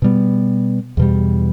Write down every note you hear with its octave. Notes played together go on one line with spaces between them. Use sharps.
B2 G3 B3
E2 B2 G3